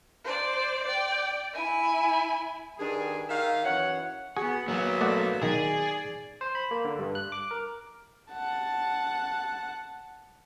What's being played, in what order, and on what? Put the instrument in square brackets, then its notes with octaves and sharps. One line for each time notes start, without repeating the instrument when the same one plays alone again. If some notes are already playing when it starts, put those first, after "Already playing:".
[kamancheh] C5 D5
D5 G5
E4 G#5
[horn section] G2 D#3 D4 G#4
D#3 E5 F5
F#2 E3 C#5 F#5
[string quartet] B3 F#5 [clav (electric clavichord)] F#4 G#4
[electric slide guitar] F#3 B3 [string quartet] A#3 E5
[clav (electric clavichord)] A3 D5 F#5
[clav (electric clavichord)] B1 D#3 [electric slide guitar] G#4 [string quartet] D5
[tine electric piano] C5
B5
A#3
D3
G2
F#6
D6
A#4
[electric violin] F#5 A5